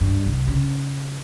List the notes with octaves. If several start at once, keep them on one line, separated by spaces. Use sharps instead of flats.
G2
C2
C#3